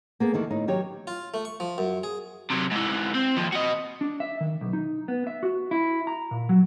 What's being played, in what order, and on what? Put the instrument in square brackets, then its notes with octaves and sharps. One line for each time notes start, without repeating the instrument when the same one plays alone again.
[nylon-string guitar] A#3 B3 G#4 A4
E2 D#3 E3 A4
A2 D#4
D#3 F#3 G4 C#5
[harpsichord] F4
A3
C#6
F3
F#2
G#4
[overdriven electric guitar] C3 F#3
G#2 E3
C4
D#2 F3
F#4 D#5
[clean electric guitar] D4
E5
D#3
B1
D#4
B3
E5
F#4
E4
A#5
A#2
F#3